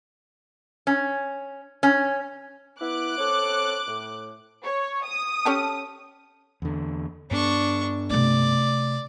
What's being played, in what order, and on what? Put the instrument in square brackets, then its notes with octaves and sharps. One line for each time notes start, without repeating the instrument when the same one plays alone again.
[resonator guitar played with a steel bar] C#4
C#4
[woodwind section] B3 E4 [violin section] D6 F#6
[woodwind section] C4 A4 C#5
A2
[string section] C#5
D#6
[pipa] C#4 G4 A4
[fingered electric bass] E2 D3
[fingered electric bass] G2 B3 [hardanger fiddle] D4 C#6
[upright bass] C3 A3 [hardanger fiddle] D5